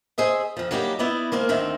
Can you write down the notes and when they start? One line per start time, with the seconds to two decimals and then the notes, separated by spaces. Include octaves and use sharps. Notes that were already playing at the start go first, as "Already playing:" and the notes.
0.18 G#4 C5 D#5 E5
0.57 F2 F3
0.71 F#3 G3 A#3 D#4 G4
0.99 B3 E4 B4 D5 D#5
1.32 G#3 A#3 C4 A#4
1.49 D2 D#3 C4 D4 E5